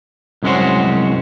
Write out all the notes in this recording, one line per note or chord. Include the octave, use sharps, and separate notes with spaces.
C2 F#2 G#3 C#4 F#4 C5